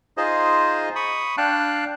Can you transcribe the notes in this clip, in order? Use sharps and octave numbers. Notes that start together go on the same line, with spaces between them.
D#4 F4 G#4 C5 D#5
B5 C#6 D#6
D4 F5 G5 A5 F#6